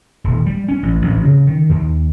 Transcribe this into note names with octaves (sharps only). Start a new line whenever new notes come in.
D#1
G3
C#4
A1
A1
C#3
D#3
D#2